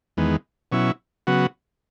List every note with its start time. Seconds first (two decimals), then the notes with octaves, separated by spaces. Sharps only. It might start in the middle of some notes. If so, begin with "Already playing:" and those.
0.17 E2 D#3 G#3 B3
0.72 B2 F#3 C#4 E4
1.27 C#3 F#3 B3 F#4